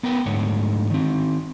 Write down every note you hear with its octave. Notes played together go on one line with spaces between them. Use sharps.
B3 A#4 B4 G5
D2 G#2 D3 C#5
D#3 C4